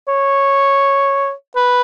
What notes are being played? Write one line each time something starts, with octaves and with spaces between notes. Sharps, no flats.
C#5
B4